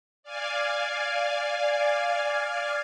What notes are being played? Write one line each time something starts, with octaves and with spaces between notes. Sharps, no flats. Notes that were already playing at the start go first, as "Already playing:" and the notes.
D5 F5 G#5